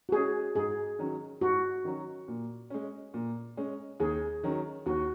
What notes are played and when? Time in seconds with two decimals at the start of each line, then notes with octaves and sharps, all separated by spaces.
0.09 F#4
0.12 G#3 C#4 G#4
0.55 G#2 G#4
0.99 D#3 F#3 C#4
1.41 G#2 F#4
1.84 D#3 F#3 C#4
2.28 A#2
2.70 G#3 C#4
3.14 A#2
3.57 G#3 C#4
4.00 D#2 G#4
4.43 D#3 F#3 C#4
4.86 D#2 F#4